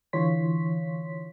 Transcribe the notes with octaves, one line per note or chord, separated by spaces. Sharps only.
D3 E3 F4 C#5 C6 B6